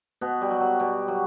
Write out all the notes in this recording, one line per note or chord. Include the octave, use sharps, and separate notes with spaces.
B2 B3
G3
F#3
F#3
B2 G3
F#3